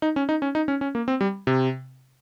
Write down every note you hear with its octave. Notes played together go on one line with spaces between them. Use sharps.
D#4
C#4
D#4
C#4
D#4
C#4
C#4
A#3
C4
G3
C3